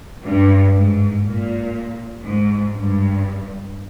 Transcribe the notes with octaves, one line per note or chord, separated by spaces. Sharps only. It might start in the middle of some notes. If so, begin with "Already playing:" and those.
G2
G#2
A#2
G#2
G2